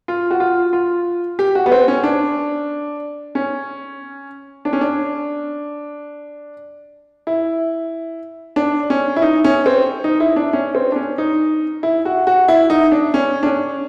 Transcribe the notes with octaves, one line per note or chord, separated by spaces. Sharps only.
F4
F#4
F4
F4
G4
F#4
B3
C4
C#4
D4
C#4
D4
C#4
D4
E4
D4
C#4
E4
D#4
C#4
C4
D#4
E4
D4
C#4
C4
D4
C#4
D#4
E4
F#4
F#4
E4
D#4
D4
C#4
D4
C#4